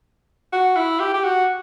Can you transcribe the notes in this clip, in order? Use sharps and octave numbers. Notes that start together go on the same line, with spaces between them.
F#4
E4
G4
G4
F#4